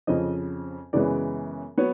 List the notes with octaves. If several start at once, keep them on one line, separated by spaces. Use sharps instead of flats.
F2 C#3 F3 D#5
F#2 C#3 E3 G#3 B3 D5
F#3 B3 C#5